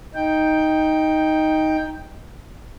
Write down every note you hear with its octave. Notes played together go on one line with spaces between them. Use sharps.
D#4 G5